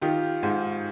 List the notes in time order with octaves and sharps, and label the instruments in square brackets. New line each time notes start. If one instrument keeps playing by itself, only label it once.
[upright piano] D#3 [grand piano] F4 G4
[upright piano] G#2